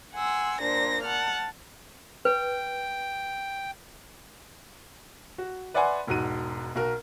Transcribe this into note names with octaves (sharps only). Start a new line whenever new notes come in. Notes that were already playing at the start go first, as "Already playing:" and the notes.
F#5 G#5 C6 E6
A#2 D4 C5 A#6
F#5 A5 F6
B4 G5
F#4
B4 D5 E5 F#5 G#5 C6
E1 G#2 F#4 D#7
B1 F#4 A#4